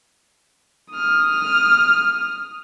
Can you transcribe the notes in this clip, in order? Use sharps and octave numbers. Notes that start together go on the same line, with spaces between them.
D#6 F6